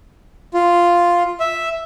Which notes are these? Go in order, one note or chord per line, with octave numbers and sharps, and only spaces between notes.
F4
E5